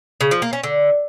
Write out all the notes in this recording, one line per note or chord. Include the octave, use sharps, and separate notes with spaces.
C#3
F3
A#3
C#4
D3